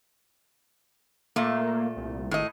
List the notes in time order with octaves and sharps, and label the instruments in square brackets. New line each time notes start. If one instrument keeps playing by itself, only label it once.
[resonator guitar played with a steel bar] A#2 A3 [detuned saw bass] A#3
[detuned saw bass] C2
[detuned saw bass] G#1 [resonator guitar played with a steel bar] A2 D#5